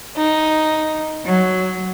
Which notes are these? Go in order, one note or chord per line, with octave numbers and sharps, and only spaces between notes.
D#4
F#3